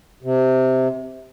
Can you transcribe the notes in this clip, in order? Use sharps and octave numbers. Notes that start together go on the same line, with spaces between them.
C3